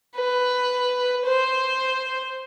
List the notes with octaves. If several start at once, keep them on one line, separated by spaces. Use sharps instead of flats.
B4
C5